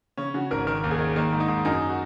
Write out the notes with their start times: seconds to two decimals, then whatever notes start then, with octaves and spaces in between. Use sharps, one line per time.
0.17 C#3 C#4
0.34 C#3 F#4
0.51 G#1 A#4
0.67 D#3 A#4
0.84 D#2
0.91 G#4
0.99 D#3
1.16 D#3 A#3
1.32 G#2
1.40 D#4
1.48 G#2
1.65 F#2 D#4
1.89 F#4